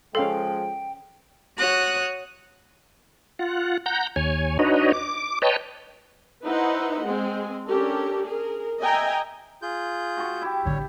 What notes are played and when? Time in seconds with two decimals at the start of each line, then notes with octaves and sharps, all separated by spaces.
0.15 F3 G#3 C#4 A4 F5 G5 C6
1.57 F#4 C#5 D#6 F#6
3.39 F4 F#5
3.86 F#5 A#5 G6
4.16 D#2 C#5 G#5
4.59 D4 D#4 F#4 B4 C#5 D#5
4.93 D6
5.42 B4 C#5 D#5 G5 A5
6.46 D#4 E4 B4 C5 D#5 F#5
7.06 G#3 C4 G#4
7.66 C#4 D4 G4 A4 A#4
8.26 G#4 A#4
8.81 D#5 E5 G5 G#5 A#5
9.62 F4 G#4 G6
10.17 F#4 A5 C#6
10.42 E4 G4
10.65 A1 D3 G3 C#5